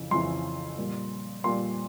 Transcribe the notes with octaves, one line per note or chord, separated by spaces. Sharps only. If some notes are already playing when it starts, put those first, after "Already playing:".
Already playing: F2 C#3 E3
F2 C#3 E3 C6
A#2 G3
A#2 G3 C6